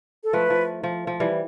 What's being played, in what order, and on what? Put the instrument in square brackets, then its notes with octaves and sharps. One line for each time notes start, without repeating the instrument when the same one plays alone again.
[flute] A4
[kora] F3 A3 [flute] B4
[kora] F3
F3
F3
E3 G3